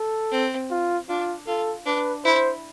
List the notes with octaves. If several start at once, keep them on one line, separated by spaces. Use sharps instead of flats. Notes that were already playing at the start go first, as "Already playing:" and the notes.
Already playing: A4
C4
F4
D4 F4
F4 A4
D4 B4
E4 C5